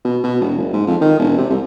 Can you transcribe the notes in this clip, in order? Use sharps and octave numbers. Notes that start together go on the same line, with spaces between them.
B2
B2
E1
F#1
G#2
F2
D#3
E1
C3
C2